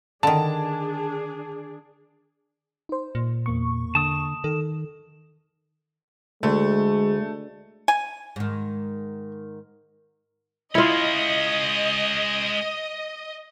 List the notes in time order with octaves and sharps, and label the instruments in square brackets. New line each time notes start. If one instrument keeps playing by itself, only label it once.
[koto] D3 D#3 [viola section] D4 G#4 [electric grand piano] A5
[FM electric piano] D#4 C5
[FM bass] A#2
[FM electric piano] E2 A#3 C#6
[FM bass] D3 [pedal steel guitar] A5 D#6
[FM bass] D#3 [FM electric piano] A4
[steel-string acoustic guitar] D2 [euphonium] G#3 [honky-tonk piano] A3
[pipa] G#5
[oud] G#2 D#3
[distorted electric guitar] G#3 C#4 [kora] E4 F4 [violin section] D#5